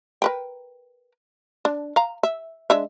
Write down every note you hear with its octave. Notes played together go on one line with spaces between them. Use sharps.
A#4 B4 G5
D4
F5 A#5
E5
G#3 D4 E5